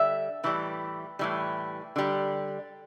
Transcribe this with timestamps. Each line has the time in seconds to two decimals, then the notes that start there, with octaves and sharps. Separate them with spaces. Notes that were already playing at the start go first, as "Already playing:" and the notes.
Already playing: D3 G3 E5
0.44 A2 E3 G3
1.19 A2 E3 G3
1.96 D3 G3